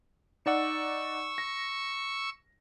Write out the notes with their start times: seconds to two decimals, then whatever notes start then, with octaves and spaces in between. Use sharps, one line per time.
0.46 D#4 D5 F#5 C#6 E6
1.38 A#6